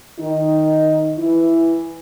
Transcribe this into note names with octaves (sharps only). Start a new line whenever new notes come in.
D#3 D#4
E3 E4